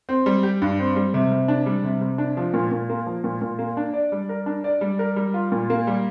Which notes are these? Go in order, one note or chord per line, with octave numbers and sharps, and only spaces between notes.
C4
G3
G4
G2
C4
G3
C3
C3
D4
G3
C3
C3
D4
F3
A#2
A#2
A#3
F3
A#2
A#2
A#3
D4
D5
G3
A#4
D4
D5
G3
A#4
G3
F4
A#2
A#3
G3